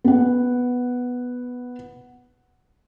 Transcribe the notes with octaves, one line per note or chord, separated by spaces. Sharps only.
B3 F#5